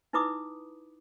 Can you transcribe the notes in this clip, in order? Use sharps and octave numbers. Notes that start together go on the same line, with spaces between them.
D#4 E4 B4 B5 D6 D#6